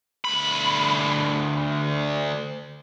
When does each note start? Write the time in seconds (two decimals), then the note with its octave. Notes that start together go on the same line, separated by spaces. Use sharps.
0.25 D2 B5